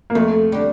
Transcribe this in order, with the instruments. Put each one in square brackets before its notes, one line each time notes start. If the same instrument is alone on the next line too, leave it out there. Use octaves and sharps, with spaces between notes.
[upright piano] A#3
[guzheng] F2 [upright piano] A3
[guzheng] D3 G3